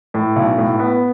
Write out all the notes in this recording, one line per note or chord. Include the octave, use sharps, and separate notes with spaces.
A2
B1
A2
B3